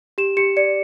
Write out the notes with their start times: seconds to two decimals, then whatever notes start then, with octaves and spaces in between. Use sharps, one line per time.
0.18 G4 E7
0.37 G4 C#7
0.57 D5 C#7